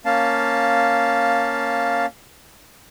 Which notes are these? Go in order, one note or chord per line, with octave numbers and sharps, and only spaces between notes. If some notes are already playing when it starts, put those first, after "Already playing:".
A#3 C#4 F5 A5